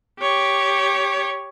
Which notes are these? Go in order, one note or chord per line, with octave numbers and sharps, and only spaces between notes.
G4 C#5